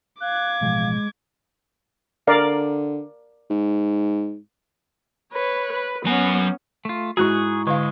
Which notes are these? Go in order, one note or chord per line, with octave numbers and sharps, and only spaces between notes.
F5 D6 F#6 G#6
A1 B2 F3 G#3
D3 A#4 D5 F5
G#2
B4 C#5
B4
F#3 B3 C#4 G#5
A3 F4
G#2 E4 F#4 G#4 C#6 F#6
D3 G#3 F5